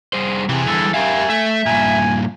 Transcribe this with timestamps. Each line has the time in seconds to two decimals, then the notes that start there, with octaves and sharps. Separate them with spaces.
0.13 G3 G#4 C5
0.49 C3 E3 G#4
0.68 D3 G3 A4 G#5
0.94 G4 A#4 E5 F5 G#5
1.30 A3 E5
1.66 G2 A#2 G#5